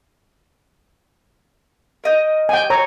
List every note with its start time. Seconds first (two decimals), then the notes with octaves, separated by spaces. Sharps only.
2.04 A#4 D#5 G6
2.49 G5 G#5
2.70 C#5 A#5